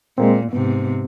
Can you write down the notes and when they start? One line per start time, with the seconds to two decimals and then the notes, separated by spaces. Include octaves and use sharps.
0.18 A#2 G#3 A#3 C4
0.53 G#2 C3 B3